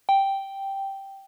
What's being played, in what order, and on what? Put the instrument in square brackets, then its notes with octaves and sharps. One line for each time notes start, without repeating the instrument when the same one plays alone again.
[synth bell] G5